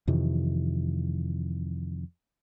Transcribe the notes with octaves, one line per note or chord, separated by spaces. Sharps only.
F2 C3 D#3 E3